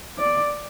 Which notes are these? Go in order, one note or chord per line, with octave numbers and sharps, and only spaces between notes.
D5